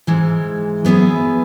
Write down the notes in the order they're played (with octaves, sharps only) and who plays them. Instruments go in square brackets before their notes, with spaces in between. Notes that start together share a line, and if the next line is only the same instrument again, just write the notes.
[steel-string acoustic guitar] G#2 E3 G#3
F#3 B3 E4 G#4 B4